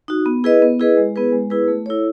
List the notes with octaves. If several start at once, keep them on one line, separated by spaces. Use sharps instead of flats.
D#4 F#4
B3
E4 G#4 B4 D#5
B3
E4 G#4 B4 D#5
G#3
B3 E4 G#4 B4
G#3
B3 E4 G#4 B4
A3
E4 A4 C#5